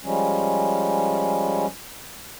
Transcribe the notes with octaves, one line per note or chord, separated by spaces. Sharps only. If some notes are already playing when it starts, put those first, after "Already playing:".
F3 G3 G#3 C#4